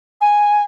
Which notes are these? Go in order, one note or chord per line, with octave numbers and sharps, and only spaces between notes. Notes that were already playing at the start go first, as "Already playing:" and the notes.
G#5